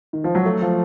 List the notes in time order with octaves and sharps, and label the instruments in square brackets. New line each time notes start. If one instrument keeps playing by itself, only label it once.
[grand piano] D#3
F3
F#3
A3
F3